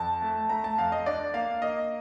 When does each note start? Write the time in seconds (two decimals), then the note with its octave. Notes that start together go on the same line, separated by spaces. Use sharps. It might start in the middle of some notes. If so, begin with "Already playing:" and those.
Already playing: F2 A5
0.22 A3
0.49 A3 A#5
0.64 A5
0.78 F2 F5
0.92 D#5
1.06 D4 D5
1.34 A#3 F5
1.62 A#3 D#5